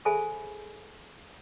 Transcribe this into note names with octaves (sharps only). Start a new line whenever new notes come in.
G#4 A4 C5 E5 G#5 B5